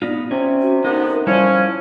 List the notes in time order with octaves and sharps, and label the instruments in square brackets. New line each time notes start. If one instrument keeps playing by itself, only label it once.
[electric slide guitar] B3 D#4 F4 [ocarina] D5
[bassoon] C3 [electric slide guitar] C#4
[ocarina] F#4
[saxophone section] D3 B3 [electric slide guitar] D#4 [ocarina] A#4
[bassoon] F3 [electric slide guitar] G3 E4 [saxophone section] C#4 [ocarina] D5